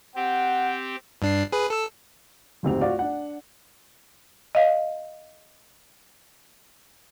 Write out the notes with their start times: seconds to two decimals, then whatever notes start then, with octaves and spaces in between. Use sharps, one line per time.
0.16 C4 G4 F#5
1.22 G2 D4 C7
1.52 G#4 B4
1.70 A4 E6
2.63 F1 D2 G#2 C4 G4 F7
2.81 F4 F#4 D5 F5
2.99 D4 F#5
4.55 D#5 F5